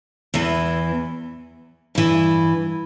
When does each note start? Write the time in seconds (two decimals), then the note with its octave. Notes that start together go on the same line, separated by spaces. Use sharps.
0.34 E2 E3
1.95 G2 E3